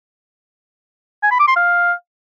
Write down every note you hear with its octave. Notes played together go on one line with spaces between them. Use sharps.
G#5
B5
D6
C6
F5